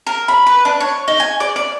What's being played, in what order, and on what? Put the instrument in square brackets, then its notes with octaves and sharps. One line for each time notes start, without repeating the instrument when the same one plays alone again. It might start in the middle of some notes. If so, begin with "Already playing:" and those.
[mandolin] A#4
B5
B4
D4
C#5
D#4
G#5
D5
D5